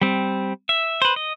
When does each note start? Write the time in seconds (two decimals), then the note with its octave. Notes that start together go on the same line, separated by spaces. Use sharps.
0.01 G3 C4
0.69 E5
1.02 B4 C5
1.16 D#5